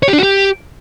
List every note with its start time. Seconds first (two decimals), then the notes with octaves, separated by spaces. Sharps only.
0.03 C#5
0.08 G4
0.13 D4
0.18 F#4
0.23 G4